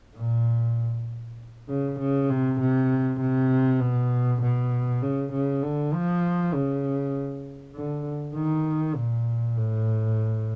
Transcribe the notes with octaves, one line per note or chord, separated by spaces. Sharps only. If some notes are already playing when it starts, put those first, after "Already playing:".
A#2
C#3
C#3
C3
C3
C3
B2
B2
C#3
C#3
D3
F3
C#3
D3
D#3
A#2
A2